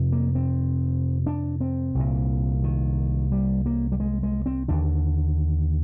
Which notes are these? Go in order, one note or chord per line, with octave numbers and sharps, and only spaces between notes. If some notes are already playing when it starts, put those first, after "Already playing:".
Already playing: F2 C3
A#3
C4
D4
C4
C2 A#2
D#3
G3
A#3
G3
G#3
G#3
C4
D#2 D3 D4